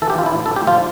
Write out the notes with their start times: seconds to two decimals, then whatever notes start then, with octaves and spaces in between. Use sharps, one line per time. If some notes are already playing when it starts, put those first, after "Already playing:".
0.02 E3 A4
0.10 G4
0.18 E3 F4
0.26 E4
0.34 A2
0.46 A4
0.51 A2
0.56 G4
0.67 F3 F4